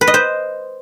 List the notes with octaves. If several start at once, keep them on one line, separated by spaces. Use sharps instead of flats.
B4
D#5
C5